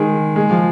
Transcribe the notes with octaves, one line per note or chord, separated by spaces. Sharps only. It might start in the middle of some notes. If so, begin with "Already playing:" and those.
Already playing: D#3 G#3
G#3
F3